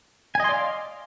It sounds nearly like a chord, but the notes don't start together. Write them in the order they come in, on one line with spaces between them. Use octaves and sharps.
G#5 D#5 C6 D5 F5